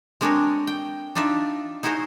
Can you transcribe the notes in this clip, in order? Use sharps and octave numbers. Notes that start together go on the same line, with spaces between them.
G#3 C4 D4 G#4 A#4 C#5
G5
D4 D#4 F4 D5 E5
D#4 E4 F#4 G#4 C5 C#5